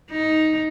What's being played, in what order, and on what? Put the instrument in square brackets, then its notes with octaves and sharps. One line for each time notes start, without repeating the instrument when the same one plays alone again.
[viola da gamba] D#4